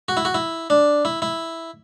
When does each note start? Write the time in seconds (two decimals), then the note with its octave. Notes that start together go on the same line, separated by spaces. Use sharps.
0.08 F#4
0.17 E4
0.25 F#4
0.34 E4
0.70 D4
1.05 E4
1.22 E4